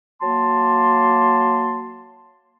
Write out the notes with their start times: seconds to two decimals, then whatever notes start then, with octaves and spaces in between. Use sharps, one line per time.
0.21 F#3 A#3 A5 C6